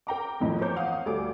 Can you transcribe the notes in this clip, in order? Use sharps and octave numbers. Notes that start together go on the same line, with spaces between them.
A#4 G5 A#5 D6
F#1 F2 A2 E3 F3 D#5
A#4 C5 C#5 D6 G6
F5 F#5 D#6
D2 G3 A4 G#5 D6